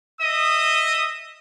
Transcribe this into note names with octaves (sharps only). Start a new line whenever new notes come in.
D#5 E5 D#6